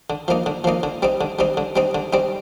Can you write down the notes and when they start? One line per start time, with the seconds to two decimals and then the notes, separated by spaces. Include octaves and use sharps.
0.10 D3
0.28 F3 A#3 D#4
0.46 D3
0.64 F3 A#3 D#4
0.83 D3
1.02 G3 C4 D#4
1.21 D3
1.39 G3 C4 D#4
1.57 D3
1.76 G3 C4 D#4
1.95 D3
2.13 G3 C4 D#4